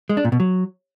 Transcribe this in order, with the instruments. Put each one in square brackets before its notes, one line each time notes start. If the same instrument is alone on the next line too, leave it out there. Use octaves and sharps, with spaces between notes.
[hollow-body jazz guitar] G#3
D4
A#2
B2
F#3